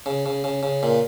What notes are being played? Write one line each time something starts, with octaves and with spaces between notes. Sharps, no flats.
C#3
C#3
C#3
C#3
A#2